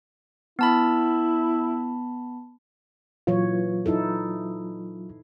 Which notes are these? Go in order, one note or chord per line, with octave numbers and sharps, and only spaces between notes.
B3 E4 A5 B5
A#2 E3 F#3 F4 C#5
D#4 E4 A4